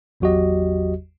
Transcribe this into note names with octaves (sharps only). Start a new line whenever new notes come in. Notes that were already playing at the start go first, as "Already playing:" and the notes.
G#1 E2 F#3 F#4 G4 D#5